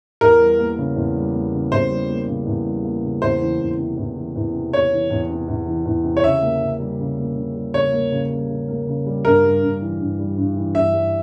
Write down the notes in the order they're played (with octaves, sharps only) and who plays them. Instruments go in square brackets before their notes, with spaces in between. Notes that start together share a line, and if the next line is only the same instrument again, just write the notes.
[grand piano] E2 [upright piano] A#4
[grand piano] G3
A#3
C#3
E2
G3
A#3
C#3
[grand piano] E2 [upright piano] C5
[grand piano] G3
A#3
C#3
E2
G3
A#3
C#3
[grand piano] E2 [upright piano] C5
[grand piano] E3
E2
C3
E2
E3
E2
C3
[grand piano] E2 [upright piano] C#5
[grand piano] E3
E2
C3
E2
E3
E2
C3
[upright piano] C#5
[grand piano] C#3 [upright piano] E5
[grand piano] A#3
C#3
G3
C#3
A#3
C#3
G3
[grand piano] C#3 [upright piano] C#5
[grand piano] A#3
C#3
G3
C#3
A#3
C#3
G3
[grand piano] G2 [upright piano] A#4
[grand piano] G3
G2
E3
G2
G3
G2
E3
[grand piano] G2 [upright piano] E5
[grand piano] G3